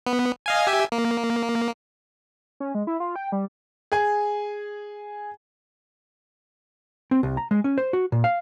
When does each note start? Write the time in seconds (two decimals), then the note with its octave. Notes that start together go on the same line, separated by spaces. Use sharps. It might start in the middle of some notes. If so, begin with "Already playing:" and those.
0.06 B3
0.46 D#5 F5 G#5
0.67 G4 E5 G#5
0.92 A#3
2.60 C#4
2.75 G#3
2.87 E4
3.00 F4
3.16 G5
3.32 G3
3.92 G#4 G#5
7.11 C4
7.23 C2
7.37 A#5
7.51 G#3
7.64 C#4
7.78 C5
7.93 F#4
8.12 A#2
8.24 F5